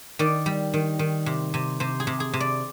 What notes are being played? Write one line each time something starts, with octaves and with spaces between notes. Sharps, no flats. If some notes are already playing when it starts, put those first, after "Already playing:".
D#3 D5
G3
D#3
D#3
C3
C3
C3 C5
G#4
C3
G#4
C3
D5